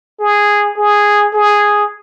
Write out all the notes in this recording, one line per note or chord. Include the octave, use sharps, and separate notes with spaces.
G#4
G#4
G#4